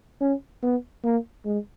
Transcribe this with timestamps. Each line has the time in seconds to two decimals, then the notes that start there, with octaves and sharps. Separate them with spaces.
0.21 C#4
0.63 B3
1.04 A#3
1.45 G#3